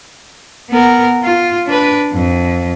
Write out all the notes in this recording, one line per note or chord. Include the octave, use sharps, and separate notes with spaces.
B3 A#4
F4
D4 B4
F2